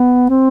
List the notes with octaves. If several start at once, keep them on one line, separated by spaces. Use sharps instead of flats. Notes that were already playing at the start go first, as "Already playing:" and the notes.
Already playing: B3
C4